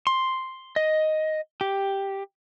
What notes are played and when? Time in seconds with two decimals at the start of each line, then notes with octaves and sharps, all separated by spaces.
0.07 C6
0.76 D#5
1.61 G4